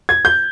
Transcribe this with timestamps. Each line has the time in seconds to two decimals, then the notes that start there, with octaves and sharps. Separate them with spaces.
0.09 G#6
0.25 G6